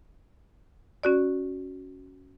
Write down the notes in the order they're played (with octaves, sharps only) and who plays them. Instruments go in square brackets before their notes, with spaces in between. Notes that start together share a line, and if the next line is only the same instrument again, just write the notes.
[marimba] C#4 F#4 D5